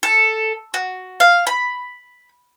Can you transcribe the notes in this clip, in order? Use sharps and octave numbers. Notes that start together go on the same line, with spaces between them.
A4
F#4
F5
B5